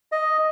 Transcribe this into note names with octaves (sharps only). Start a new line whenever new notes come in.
D#5